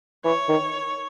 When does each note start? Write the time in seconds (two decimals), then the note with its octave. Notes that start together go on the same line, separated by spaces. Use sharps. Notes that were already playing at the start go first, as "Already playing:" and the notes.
0.25 E3 C#5
0.49 D#3